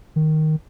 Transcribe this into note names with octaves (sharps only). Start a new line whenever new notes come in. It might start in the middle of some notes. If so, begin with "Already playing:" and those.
D#3